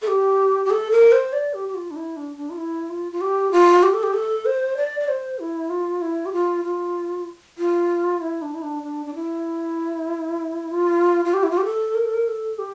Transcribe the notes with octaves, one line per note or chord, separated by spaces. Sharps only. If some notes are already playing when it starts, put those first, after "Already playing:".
A4
G4
G4
A4
A#4
C5
D5
G4
G4
F4
D4
E4
D4
D4
F4
E4
F4
F4
G4
F4
G4
A4
G4
A4
C5
D5
D5
C5
E4
F4
E4
G4
F4
F4
F4
E4
D4
E4
D4
D4
D4
E4
F4
F4
G4
E4
F4
G4
A4
A#4
A4
A#4
A4
G4